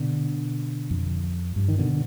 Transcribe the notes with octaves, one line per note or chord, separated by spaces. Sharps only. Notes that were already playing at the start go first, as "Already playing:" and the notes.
Already playing: B2 D3
F2
G2
D#3
B2 D3